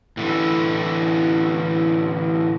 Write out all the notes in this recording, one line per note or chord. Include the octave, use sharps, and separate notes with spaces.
A2 D3 E3